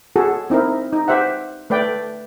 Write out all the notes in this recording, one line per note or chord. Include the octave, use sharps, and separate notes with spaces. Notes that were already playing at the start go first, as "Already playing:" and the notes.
F#4 G#4 A4
C4 D#4 E4 A#4
D#4
G4 C5 E5 F#5
A3 B4 D5 G5